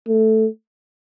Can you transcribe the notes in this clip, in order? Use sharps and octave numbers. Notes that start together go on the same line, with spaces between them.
A3